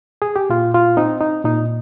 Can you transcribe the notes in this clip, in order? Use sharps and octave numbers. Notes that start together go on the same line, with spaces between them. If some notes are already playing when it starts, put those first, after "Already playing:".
G#4
G4
A#2 F4
F4
C4 D#4
D#4
A#2 D#4